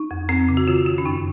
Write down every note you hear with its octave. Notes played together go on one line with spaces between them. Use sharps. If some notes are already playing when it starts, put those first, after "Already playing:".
Already playing: D#4
F2
F2 C4
C#3
F#4
D#3 F4
D#3 F4
C#4
F#2 D#4